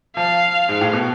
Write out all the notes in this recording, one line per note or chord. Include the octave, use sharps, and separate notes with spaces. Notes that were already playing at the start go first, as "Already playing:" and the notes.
F3 F5
G#2
A2
B2